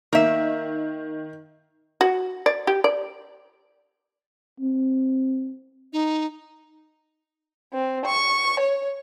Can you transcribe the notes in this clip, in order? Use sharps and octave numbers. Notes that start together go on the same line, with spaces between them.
D#3 A#3 E5
F#4
D5
G4
D5
C4
D#4
C4
C#6
C#5